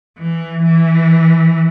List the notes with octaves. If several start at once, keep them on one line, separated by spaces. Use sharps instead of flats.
E3
E3